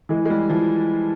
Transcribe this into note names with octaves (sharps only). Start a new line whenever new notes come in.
E3 G#3
G#3
G3
E3 F3